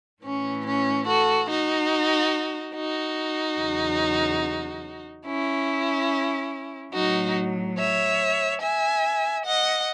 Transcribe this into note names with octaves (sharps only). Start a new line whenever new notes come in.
A2 E3 C#4
C#4
F#4 A4
D#4 F#4
D#4 F#4
E2 C#3 F#3
C#4 E4
A2 F#3 D#4 F#4
C#5 E5
E5 G#5
D#5 F#5